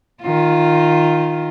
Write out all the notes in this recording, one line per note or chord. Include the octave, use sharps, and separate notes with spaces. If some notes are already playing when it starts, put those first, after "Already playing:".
D#3 F4